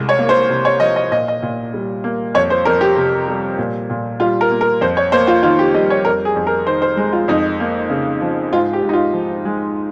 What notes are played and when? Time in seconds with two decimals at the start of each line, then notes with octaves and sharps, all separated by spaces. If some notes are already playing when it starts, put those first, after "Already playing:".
Already playing: C2 G#3
0.09 C#5
0.19 A#3
0.29 C5
0.49 C3
0.65 C#5
0.80 F3 D#5
0.96 D#5
1.11 A#2 D#5
1.28 D#5
1.42 A#2
1.74 G3
2.04 A#3
2.35 F2 C#5
2.50 C5
2.65 F2 A#4
2.81 G4
2.96 C3
3.28 G3
3.58 A#2
3.90 A#2
4.20 G3 F4
4.41 A#4
4.51 A#3
4.61 A#4
4.81 F2 C5
4.97 C#5
5.12 A#3 C5
5.27 F4
5.43 D#3 F4
5.59 G4
5.74 G3 D#5
5.90 C#5
6.05 F2 A#4
6.25 G#4
6.36 F2
6.47 A#4
6.67 D#3 C5
6.82 C5
6.97 G#3
7.13 F4
7.28 F2 D#4
7.60 A#3
7.90 C#3
8.22 F3
8.52 G#2 F4
8.73 G4
8.83 G#2
8.89 D#4
8.93 F4
9.13 F3
9.45 G#3